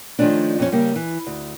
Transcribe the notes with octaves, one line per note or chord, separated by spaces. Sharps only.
D#3 F3 A3 C#4 D4
F2 F3 C#4
C#3 G3 A#3
E3
D2